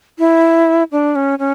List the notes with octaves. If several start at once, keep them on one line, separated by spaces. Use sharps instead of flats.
E4
D4
C#4
C#4